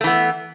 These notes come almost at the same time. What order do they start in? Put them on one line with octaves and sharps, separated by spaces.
A3 E3 B3